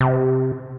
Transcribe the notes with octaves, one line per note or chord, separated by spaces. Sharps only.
C3